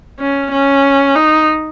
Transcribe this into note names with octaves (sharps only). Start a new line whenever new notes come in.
C#4
C#4
D#4